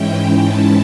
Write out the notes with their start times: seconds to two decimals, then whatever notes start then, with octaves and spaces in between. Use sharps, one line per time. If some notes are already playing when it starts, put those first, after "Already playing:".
Already playing: G#2 E3 G#3 C#4 E4 G5
0.43 A5